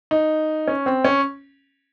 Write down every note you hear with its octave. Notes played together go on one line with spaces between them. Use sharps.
D#4
C#4
C4
C#4